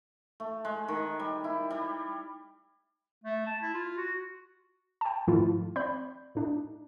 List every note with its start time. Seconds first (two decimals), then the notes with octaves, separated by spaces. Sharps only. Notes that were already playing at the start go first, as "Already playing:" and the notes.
0.40 A3
0.65 G#3
0.88 D#3
1.20 G3
1.44 E4
1.70 G3
3.24 A3
3.46 A5
3.62 E4
3.74 F4
3.98 F#4
5.01 G5 A5
5.27 G#2 D#3 F3 A3 E4 F4
5.76 C4 D5 B5 G6
6.35 A2 D4 D#4